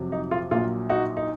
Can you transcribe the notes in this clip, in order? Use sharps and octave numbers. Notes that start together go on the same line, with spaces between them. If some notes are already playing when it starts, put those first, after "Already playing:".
Already playing: F2 C3 F#3
D#4
F4
A#1 A#2 F#3 F4
D#4 F#4
D#4